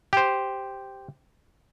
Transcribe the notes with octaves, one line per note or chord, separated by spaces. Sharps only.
G4 C5